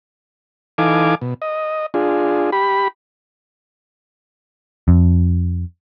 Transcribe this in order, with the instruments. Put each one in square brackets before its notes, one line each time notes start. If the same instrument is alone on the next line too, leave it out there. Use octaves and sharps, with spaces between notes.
[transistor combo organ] E3 D#4 A4 F5 G#5 D6
B2
D#5
D4 F4 G#4
G4 B5
[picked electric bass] F2